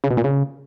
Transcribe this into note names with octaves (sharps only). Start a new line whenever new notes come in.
C#3
B2
A#2
C#3